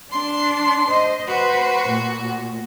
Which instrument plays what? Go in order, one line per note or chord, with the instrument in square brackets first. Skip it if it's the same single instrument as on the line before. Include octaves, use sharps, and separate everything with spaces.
[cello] D4 [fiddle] C6
[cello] C5 D#5
[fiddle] F#4 [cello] B4 C5
[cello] A#2